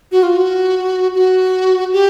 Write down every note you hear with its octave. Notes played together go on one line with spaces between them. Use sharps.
F#4
F4
F#4
F#4
G4